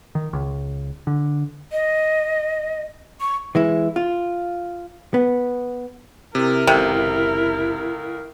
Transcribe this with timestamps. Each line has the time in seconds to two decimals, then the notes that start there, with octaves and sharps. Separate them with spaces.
0.15 D#3
0.33 C#2
1.07 D3
1.72 D#5
3.21 C#6
3.55 E3 G#3 E4
3.96 F4
5.14 B3
6.35 C3 E4 A#4
6.67 F#1 C#2 C3 D#3 A4